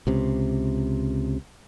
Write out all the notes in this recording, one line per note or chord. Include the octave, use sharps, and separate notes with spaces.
C#2 C3